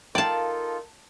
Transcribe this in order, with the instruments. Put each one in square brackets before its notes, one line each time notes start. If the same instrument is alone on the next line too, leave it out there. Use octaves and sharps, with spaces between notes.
[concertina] D#4 F4 A4 [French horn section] A#4 [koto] D5 A5 [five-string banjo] F5 G5